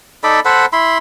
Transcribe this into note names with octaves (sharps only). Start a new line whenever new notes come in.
D#4 A4 D5 B5
A4 C5 F#5 B5
E4 B5 C6